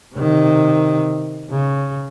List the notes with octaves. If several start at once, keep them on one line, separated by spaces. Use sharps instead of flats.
C3 D#3
C#3